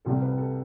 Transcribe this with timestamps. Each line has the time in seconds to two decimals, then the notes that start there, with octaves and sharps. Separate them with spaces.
0.05 C2 C3 G3 A4
0.22 B4
0.38 A4